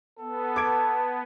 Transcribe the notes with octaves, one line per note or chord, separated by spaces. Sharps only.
B3 A4
A5 D6 G#6 D7